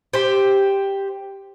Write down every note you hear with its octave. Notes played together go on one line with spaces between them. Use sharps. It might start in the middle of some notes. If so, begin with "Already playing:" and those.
G4 C5